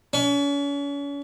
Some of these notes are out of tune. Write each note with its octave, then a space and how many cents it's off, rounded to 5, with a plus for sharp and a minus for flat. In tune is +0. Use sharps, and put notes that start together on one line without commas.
C#4 +40